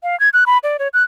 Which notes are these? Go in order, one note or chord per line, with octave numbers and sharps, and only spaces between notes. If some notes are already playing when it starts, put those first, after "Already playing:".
F5
G#6
F#6
B5
D5
C#5
F#6